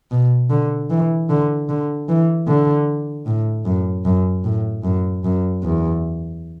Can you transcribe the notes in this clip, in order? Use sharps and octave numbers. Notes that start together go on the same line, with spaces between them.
B2
D3
E3
D3
D3
E3
D3
A2
F#2
F#2
A2
F#2
F#2
E2